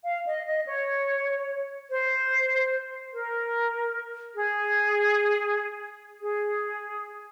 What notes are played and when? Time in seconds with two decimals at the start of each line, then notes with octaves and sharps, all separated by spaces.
0.03 F5
0.25 D#5
0.45 D#5
0.66 C#5
1.89 C5
3.12 A#4
4.35 G#4
6.20 G#4